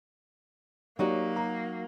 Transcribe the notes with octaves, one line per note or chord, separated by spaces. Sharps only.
F#3 A#3 D#4 F#4 G4 D5 F#5
A#5